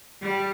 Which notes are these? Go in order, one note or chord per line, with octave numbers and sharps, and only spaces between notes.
G3